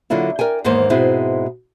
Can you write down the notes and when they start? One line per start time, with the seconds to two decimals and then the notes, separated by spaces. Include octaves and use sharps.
0.10 D3 F#3 A#3 E4 F4
0.39 A#4 D5 G5 G#5
0.64 E2 G#2 D#3 A#3 C5 C#5
0.90 G#2 B2 G#3 C4 E4